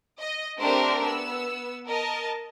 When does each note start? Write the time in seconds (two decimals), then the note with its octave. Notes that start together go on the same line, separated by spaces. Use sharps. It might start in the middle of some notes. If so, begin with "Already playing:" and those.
0.20 D#5
0.59 A3 C4 D4 G4 A#4 C5
1.03 B3 E6
1.88 A#4 D#5 A5